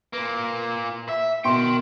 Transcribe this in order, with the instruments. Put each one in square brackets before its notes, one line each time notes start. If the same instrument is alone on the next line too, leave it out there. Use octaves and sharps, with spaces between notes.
[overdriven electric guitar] A#2 A#3 [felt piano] B4
[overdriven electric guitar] E5
[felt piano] B2 C6 [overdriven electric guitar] A#4 G5